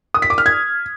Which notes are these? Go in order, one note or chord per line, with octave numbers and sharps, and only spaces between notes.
D#6
B6
D6
F6
G#6